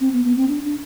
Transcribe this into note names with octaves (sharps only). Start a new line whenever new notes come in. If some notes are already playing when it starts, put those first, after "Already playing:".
C4
B3
B3
C4
D4
D4